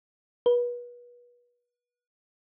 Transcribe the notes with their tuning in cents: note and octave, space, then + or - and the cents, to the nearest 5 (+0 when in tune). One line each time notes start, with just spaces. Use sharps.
B4 -30